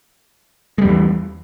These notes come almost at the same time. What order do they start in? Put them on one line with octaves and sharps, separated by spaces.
G#3 G3 E2 E3